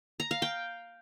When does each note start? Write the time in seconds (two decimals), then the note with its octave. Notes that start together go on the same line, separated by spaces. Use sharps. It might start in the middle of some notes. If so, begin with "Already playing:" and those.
0.20 A#5
0.31 F5
0.42 G5